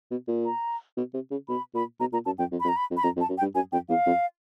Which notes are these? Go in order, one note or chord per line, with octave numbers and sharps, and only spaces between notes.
B2
A#2
A#5
B2
C3
C#3
B2 B5
A#2 B5
B2 A#5
A#2 A#5
F#2 A5
F2 G5
F2
B5
F2
A#5
B5
F2
B5
F2 A#5
F2
A5
F#2
G5
G2
F#2 G#5
F2 G5
E2 F5
F2